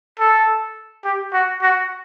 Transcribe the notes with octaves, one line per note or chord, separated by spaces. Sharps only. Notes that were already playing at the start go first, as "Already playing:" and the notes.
A4
G4
F#4
F#4